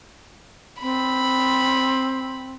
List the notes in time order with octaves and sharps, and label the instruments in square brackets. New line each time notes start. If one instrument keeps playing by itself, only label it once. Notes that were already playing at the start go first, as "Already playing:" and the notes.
[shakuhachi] C4 [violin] B5